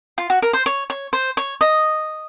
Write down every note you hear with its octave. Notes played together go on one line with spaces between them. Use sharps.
F4
F#4
A#4
C5
C#5
C#5
C5
C#5
D#5